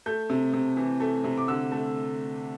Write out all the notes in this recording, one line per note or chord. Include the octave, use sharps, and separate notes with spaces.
A3 G6
C3
C3
E3
A3
C3
D6
D3 E6
A3